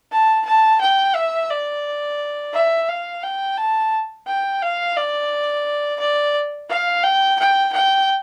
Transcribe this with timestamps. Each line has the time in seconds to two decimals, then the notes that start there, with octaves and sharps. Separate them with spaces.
0.12 A5
0.46 A5
0.81 G5
1.15 E5
1.50 D5
2.53 E5
2.89 F5
3.23 G5
3.57 A5
4.27 G5
4.62 F5
4.96 D5
6.00 D5
6.69 F5
7.03 G5
7.39 G5
7.73 G5